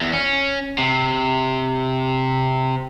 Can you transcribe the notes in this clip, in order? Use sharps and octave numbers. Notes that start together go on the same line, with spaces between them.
E2
C#4
C3